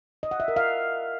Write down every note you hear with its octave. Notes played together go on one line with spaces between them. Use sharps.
D#5
F#5
E5
A#4
F5